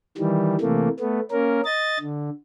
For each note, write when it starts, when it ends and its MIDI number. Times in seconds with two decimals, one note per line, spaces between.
0.18 0.56 51
0.18 0.56 52
0.18 0.56 55
0.61 0.88 48
0.61 0.88 52
0.61 0.88 57
0.61 0.88 58
1.00 1.20 57
1.00 1.20 59
1.31 1.61 58
1.31 1.61 61
1.31 1.61 70
1.65 1.98 75
1.65 1.98 93
2.00 2.30 50